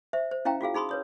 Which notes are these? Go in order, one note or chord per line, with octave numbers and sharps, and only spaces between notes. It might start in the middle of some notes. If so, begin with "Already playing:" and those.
C5 E5
C5
C#4 E4 F5 G5 A#5
F4 F#4 G#4 F5
D#4 G#4 B5 C6 D#6
B4 C#5 D#6